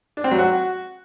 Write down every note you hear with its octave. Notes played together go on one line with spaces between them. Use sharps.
D4
C4
F#3
F#4